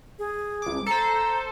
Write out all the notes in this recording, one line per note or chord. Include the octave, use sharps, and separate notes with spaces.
G#4
C#2 D6
A4 C5 A#5